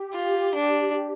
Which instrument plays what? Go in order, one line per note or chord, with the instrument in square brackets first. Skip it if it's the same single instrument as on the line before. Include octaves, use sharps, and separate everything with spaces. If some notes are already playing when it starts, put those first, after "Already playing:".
Already playing: [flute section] G4
[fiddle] F4
D4